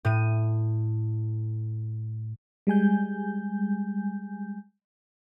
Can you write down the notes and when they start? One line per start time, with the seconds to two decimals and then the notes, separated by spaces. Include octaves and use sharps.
0.05 A2 D#7
2.67 G3 G#3 G#5 G6